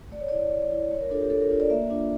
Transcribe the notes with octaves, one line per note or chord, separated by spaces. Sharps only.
A3 D5
C#5
E4 D5
A3
E4
A3 C#5
A#4
D4 F4 A4
G4
A3 A4
A#4
D4 F4
D5
A#3 E5
D4 F4